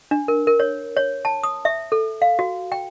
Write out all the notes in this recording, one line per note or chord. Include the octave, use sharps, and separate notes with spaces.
D4
A#4
A#4
C#5
C#5
A5
D#6
E5
A4
F5
F#4
G5